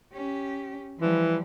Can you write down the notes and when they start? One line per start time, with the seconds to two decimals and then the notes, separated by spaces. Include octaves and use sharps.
0.13 C#4 G4
0.99 E3 F3 G3